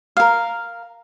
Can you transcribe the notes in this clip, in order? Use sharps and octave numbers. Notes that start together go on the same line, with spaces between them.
A#4 F5